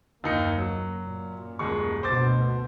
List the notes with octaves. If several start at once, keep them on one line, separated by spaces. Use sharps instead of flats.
F#1 D#2 A#3 D#4 C#7
F#3
F#2 A#2
D#1 G#3 C#6
D2 B2 C5 D6 A6